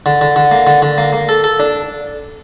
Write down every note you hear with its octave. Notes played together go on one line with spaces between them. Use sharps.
D3
D3
D3
A#3
D3
D3
A#3
A#3
A4
A4
D4